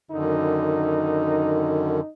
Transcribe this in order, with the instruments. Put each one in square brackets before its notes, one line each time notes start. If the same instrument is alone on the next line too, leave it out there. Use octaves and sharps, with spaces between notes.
[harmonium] F#2 D3 D#3 [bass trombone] D#4